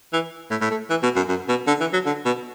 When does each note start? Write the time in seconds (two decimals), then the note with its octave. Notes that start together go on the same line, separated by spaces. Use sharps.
0.13 E3
0.51 A2
0.61 A2
0.71 A3
0.90 E3
1.03 B2
1.16 F#2
1.29 F#2
1.49 B2
1.67 D3
1.80 E3
1.93 F#3
2.06 D3
2.25 B2